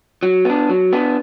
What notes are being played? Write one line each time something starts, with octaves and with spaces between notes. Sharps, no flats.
F#3
B3 D4
F#3
B3 D4